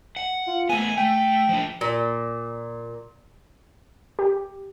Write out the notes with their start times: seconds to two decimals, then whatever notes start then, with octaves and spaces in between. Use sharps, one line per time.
0.17 F#5
0.47 F4
0.69 A3 B3 G#5
0.97 A3 G5
1.49 F3 D4
1.81 A#2
4.19 G4